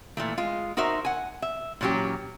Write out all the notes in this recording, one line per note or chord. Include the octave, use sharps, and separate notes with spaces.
A#2 E3 A3
G#3 F4
D#4 F#4 A#4 C5 E5
F#5 G#5
E5
A#2 E3 F#3 C#4 G4